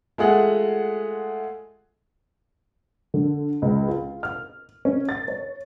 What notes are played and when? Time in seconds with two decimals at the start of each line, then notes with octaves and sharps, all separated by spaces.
0.18 G#3 A3 F4 G#4 F#5
3.14 D3
3.62 C#2
3.88 F4
4.23 F6
4.85 C#4
5.09 A6
5.28 C#5